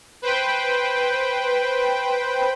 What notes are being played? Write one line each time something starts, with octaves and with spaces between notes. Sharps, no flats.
B4 C5 G5